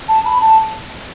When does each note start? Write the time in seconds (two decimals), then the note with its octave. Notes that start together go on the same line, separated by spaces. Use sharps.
0.08 A5
0.26 B5
0.41 A5